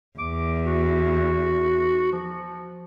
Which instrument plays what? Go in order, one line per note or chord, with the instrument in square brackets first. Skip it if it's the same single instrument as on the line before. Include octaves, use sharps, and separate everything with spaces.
[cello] E2 [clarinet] D6
[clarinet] F#4
F3